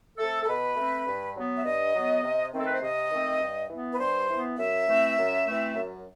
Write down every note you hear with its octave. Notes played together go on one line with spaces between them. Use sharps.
A3 C4 A4
A4
B2 B4
A3 C4
G2
F#3 B3
E5
G2 D#5
F#3 B3
C3
D#3 A3 C4
A4
B4
C5
C3 D#5
D#3 A3 C4
G2
E3 B3
B4
G2 C5
E3 B3
F#2 E5
E3 A3 C4
F#2
E3 A3 C4
F#2